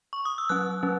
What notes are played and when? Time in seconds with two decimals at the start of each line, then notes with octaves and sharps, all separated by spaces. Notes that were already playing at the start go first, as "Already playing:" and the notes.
0.13 C#6
0.25 D#6
0.38 E6
0.49 F#3 C#4 F#6
0.83 F#3 C#4